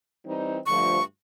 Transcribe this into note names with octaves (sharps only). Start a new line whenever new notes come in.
E3 G3 C4 D#4
G2 D3 F3 A3 C#6